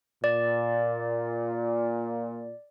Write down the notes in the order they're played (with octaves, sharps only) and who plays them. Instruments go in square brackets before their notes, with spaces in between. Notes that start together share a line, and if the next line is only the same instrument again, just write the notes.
[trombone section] A#2 [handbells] D5